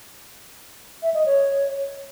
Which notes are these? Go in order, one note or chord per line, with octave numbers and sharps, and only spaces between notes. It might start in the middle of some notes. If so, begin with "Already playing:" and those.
E5
D#5
C#5